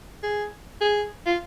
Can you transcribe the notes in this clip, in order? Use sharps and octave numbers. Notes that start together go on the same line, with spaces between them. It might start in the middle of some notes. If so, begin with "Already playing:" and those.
G#4
G#4
F4